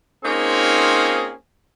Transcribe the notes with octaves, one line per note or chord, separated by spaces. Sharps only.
A#3 C4 C#4 D#4 F4 G#4